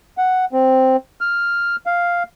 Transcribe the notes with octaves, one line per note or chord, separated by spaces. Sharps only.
F#5
C4
F6
F5